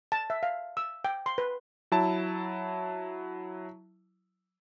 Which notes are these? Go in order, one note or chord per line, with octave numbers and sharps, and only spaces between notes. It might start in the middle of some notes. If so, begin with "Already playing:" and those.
A5
E5
F5
E6
G5
C6
B4
F#3 E4 A5